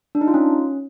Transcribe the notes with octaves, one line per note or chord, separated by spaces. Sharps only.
D4
D#4
F4
C#4